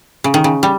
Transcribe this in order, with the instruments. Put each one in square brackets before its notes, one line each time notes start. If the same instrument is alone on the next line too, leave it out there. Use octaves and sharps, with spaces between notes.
[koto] C#3
D#3
C#3
G3